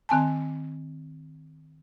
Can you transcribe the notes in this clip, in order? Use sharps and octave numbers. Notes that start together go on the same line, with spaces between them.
D#3 C4 G#5 A5